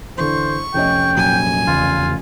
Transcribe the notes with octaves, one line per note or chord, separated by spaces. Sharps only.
D3 E3 C5 C#6
F1 C#4 D#5 G5
A#2 F#3 G#5
E2 C#3 F4